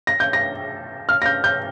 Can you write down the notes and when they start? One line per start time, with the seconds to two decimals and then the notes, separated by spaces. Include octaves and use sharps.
0.07 A#6
0.20 G6
0.33 A#6
1.09 F6
1.22 A#6
1.26 G6
1.44 G6